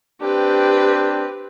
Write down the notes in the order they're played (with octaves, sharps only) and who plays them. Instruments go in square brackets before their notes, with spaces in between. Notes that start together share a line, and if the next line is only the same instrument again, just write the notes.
[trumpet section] C4 D4 [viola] G4 B4